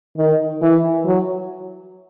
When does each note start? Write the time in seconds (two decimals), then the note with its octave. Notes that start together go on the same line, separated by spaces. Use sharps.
0.17 D#3
0.62 E3
1.05 F#3